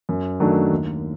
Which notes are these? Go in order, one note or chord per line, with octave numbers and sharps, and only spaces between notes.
F#2
D#3 F#3 A3 D4
D#2